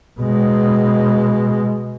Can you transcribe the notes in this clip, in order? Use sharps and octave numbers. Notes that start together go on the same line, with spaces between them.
B2 G#3